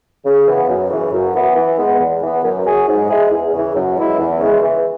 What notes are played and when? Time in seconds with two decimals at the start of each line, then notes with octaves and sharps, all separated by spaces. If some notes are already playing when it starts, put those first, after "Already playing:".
0.24 C#3
0.46 E3 B3
0.67 F#2
0.90 C#3 E3
1.11 F#2
1.33 E3 B3
1.55 E3
1.77 G#3 B3
1.98 E2
2.21 E3 B3
2.43 F#2
2.64 F#3 C#4 G#4
2.87 G#2
3.08 G#3 E4 G#4
3.30 E2
3.52 C#3 E3
3.74 F#2
3.96 E3 G#3 E4
4.17 E2
4.39 C#3 E3 G#3 E4
4.61 E3